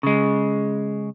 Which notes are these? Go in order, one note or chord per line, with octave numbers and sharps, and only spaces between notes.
C#3 G#3